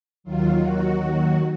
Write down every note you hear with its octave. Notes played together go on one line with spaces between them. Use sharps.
D#2 D#3 F#3 F4
F#4